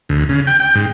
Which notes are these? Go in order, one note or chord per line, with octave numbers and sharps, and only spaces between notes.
D2
C#3
G5
G5
G#2